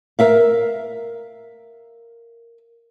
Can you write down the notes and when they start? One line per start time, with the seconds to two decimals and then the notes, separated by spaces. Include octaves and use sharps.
0.19 A#4 E5 F5